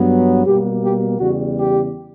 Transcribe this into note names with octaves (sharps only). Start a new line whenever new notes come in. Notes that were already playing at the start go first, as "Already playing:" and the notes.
Already playing: G2 F#3 B3
B2 G3 A#3 G4
G4
E2 C#3 G3 F#4
G4